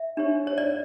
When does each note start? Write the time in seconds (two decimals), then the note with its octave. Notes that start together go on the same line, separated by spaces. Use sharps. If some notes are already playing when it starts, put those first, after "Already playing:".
Already playing: E5
0.17 D4 G4 C#5
0.47 C#5
0.58 D5